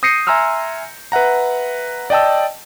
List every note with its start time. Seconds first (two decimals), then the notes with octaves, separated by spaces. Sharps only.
0.03 D#6 G6 A#6 C7 C#7 D#7
0.27 E5 G#5 A#5 C6 E6 F6
1.12 B4 E5 F#5 A#5
2.10 D5 D#5 G5 A5 E6